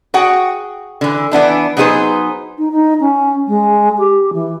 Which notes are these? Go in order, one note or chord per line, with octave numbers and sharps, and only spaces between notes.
F#4 G#4 F#5 G5
D3 E3
E3 B3 D4 E4
F#3 B3 D#4 G#4 B4 C5
D#4
D#4
C#4
G#3
G4
E3